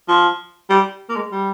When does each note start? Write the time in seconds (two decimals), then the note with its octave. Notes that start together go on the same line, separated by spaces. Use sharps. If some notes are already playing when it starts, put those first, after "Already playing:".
0.08 F3
0.70 G3
1.09 A#3
1.16 G#3
1.32 G3